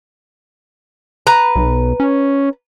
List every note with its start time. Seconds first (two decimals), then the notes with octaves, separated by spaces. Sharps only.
1.27 B4 A#5
1.55 B1
2.00 C#4